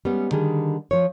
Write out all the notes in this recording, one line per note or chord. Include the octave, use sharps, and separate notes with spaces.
G3 G#3 B3 C#4
D3 D#3 G3 G#4
F3 C#5